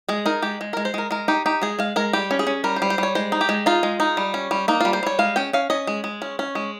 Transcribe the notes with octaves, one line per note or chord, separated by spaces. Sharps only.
G#3 G#4
D#4 A#4
G#3 G4
G#3
G#3 A#4
C5
G#3 A#4
G#3 A#4
D#4 G4
D#4 G4
G#3 G#4
G#3 F5
G#3 A#4
G3 G4
C#4
G#4
C#4
G3 A#4
C5
G3
C5
G3 C#5
G#3 C5
D#4
G4
G#3
D#4 F4
G#3
D#4
G3
C#4
G3
A#3 D#4
G3 F4
C5
G3 C#5
G#3 F5
C#4 G5
C#4 F5
C#4 D#5
G#3
G#3
C#4
C#4
G#3